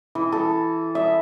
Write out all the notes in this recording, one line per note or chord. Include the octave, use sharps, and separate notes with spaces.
E3
A4
E5